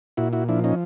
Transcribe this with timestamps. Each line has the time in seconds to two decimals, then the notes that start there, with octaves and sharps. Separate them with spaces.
0.17 A#2 E4 F#4
0.33 E4 F#4
0.49 F3 D4 E4
0.64 C#4 D#4